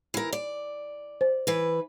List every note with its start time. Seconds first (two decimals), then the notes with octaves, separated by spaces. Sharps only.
0.14 E3 A#4
0.33 D5
1.21 C5
1.47 E3 B4